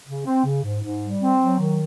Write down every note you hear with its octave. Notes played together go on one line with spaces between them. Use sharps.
C#3
C4
C#3
G#2
G#2
G3
C4
F#3
D#3